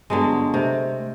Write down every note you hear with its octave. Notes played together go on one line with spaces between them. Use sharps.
G2 D3 F#3 G#3 B3
C3 A3 C5